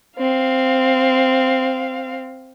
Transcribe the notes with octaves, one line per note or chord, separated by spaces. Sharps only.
C4 F5